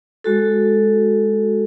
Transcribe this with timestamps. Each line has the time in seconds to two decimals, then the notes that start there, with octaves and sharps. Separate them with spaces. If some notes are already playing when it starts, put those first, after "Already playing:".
0.24 G#3 F#4 A4